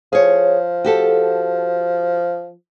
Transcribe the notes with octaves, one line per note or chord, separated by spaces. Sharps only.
F3 G#4 C#5
F#4 G4 A4